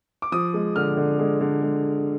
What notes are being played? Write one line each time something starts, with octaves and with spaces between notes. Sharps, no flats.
D6
F3 D#6
G#3
D3 F6
D3
G#3
D3
G#3